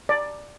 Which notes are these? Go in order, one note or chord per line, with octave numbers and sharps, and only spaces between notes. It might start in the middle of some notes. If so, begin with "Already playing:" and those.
D5